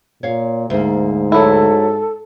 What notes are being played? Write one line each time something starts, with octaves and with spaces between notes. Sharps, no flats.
A#2 C#5 F5
D2 G#2 A#3
F#3 E4 A4